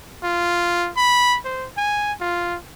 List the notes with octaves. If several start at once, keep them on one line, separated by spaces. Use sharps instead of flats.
F4
B5
C5
G#5
F4